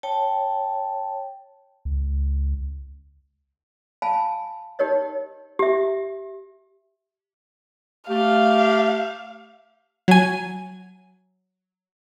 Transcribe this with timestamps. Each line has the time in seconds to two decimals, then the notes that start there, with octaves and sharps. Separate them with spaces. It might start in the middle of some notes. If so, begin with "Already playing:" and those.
0.03 C#5 G5 A5
1.85 C#2
4.02 F5 G#5 A5 B5
4.79 D#4 G4 A#4 C#5 D#5
5.59 G4 E5
8.09 A3 G4 F5
10.08 F#3 G#5